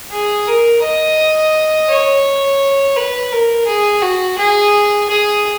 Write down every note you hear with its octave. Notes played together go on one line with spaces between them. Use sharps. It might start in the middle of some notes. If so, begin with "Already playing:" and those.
G#4
A#4
D#5
C#5
B4
A#4
G#4
F#4
G#4
G#4